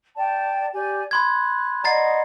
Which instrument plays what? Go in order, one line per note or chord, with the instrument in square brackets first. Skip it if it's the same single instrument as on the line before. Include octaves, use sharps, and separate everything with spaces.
[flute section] D5 G5 A5
G4 D5 G#5
[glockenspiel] B5 C6 G#6 [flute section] F#6
[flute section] D5 D#5 F#5 [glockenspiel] A#5 A6 C7